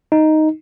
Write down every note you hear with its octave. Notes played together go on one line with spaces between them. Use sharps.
D#4